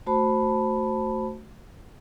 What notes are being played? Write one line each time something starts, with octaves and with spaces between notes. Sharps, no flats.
A3 F#4 C5 A5 B5